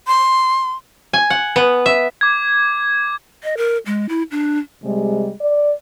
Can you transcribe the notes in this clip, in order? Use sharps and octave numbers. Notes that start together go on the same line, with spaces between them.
C6
G#5
F#5
B3
E5
D6 G#6
D#5
A#4
G#3
E4
D4
C3 G3 G#3
D5